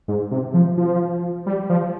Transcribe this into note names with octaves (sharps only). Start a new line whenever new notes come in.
G#2
C3
F3
F3
G3
F3